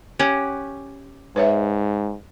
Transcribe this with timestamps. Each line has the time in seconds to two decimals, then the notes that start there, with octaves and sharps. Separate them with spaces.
0.19 C#4 G4 F#5
1.36 G#2 B4 C#5 E5